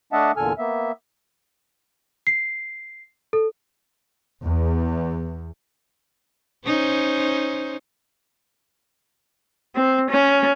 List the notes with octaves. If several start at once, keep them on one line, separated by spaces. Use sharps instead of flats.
A3 D4 D#5 E5 F#5 A5
E2 A#2 D3 A4 G#5 F6
A#3 B3 E5
C7
A4
E2
C#4 D#4 C5
C4
C#4